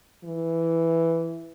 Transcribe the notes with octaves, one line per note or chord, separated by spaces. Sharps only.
E3